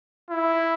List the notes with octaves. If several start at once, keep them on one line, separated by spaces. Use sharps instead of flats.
E4